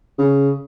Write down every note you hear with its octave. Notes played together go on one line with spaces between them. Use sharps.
C#3